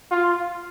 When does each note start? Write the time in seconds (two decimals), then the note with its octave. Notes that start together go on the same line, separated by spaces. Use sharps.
0.11 F4